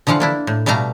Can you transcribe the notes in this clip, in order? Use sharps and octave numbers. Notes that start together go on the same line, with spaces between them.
D3 E3 F3 F5 F#5
A#3 D4 E4
A2
B2 G3 A3 F5 A#5